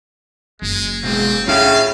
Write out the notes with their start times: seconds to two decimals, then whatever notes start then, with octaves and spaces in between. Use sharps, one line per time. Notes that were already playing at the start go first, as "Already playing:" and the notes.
0.62 F#1 G#3
1.03 B2 G#3 C4 G#4
1.48 A2 C#3 D4 F4 E5 F5